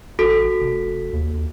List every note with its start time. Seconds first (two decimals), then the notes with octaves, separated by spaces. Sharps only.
0.19 A1 F#4 A4 B6
0.60 F1
1.13 D#2